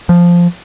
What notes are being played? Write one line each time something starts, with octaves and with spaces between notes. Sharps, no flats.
F3